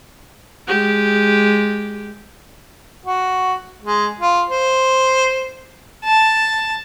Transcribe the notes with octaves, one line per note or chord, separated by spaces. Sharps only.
G#3 G4
F#4
G#3
F4
C5
A5